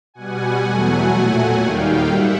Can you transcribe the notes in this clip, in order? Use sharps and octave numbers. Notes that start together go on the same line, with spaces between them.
B2 G3 F#5 G#5
E2 B2 F#3 A3
A#2 F#3 A3
D#2 D#3 G3 F5 G5
G#2 E5 F#5